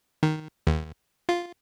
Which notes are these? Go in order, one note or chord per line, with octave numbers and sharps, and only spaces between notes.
D#3
D#2
F4